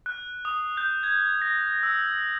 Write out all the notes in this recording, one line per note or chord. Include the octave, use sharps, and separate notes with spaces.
F#6
D#6
G6
G#6
A#6
E6